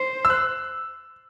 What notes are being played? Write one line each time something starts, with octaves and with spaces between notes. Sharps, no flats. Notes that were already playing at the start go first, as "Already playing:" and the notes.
Already playing: C5
E6
F#6